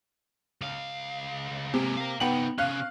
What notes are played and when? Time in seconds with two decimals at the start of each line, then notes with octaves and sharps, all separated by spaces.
0.61 C#2 F5
1.74 C3 G#3 A#3
1.97 A#4 F5
2.20 C3 B3 D#4 G5 F#7
2.58 C3 C#4 F5 F#6